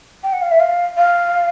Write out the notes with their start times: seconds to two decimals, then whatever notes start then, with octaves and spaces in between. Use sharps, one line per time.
0.23 G5
0.33 F#5
0.42 F5
0.51 E5
0.60 F5
0.97 F5